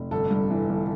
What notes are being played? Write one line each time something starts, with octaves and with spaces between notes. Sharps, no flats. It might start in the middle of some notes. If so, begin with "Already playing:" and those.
Already playing: F1
G1 A4
G2
E3
G1